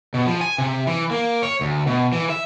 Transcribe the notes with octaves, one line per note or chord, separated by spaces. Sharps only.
B2
F3
G#5
C3
E3
A#3
C#5
D2
B2
E3
E5